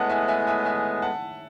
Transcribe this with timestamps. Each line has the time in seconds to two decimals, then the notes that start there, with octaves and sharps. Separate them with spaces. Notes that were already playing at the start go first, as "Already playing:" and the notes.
Already playing: A2 G#3 B3 F#5 A5
0.09 E5 G#5
0.28 E5 G#5
0.47 E5 G#5
0.65 E5 G#5
1.02 F#5 A5